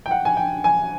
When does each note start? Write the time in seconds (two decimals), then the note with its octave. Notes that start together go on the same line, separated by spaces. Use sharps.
0.06 G5
0.11 F#5
0.25 G#5
0.37 G5
0.64 G#5